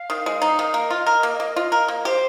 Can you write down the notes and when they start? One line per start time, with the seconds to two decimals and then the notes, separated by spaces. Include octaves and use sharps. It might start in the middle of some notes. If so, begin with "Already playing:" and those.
Already playing: F5
0.10 D#3
0.26 G#3
0.42 D#4
0.59 D#3
0.74 A#3 D#5
0.90 F4
1.06 A#4
1.23 A#3
1.40 A#3
1.56 F4
1.72 A#4
1.88 A#3
2.05 G4 C5